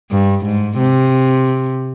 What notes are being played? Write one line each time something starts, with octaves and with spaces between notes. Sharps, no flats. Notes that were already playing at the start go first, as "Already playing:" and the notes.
G2
G#2
C3